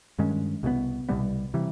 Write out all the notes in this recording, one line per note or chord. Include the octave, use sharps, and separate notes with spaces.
G2 D#3 G#3 C#4
C2 B2 G3 B3
C2 B2 G3 B3
C3 E3 G3